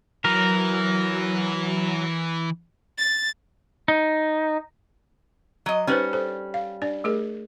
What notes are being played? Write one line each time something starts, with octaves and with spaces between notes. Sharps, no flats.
E3 F#3 A#4
A6
D#4
F#3 D#5
G3 C#4 D#4 B4 C5
A4 C5
F5
D4 D5
A3 G#4 A#4